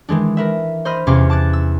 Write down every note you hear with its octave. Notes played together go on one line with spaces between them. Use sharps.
D#3 E3 G#3 D4
A#4 B4 E5
C5 D#5 B5 F6
E2 C3 C#4 F5 D6
A5 D6 F#6 A6
E6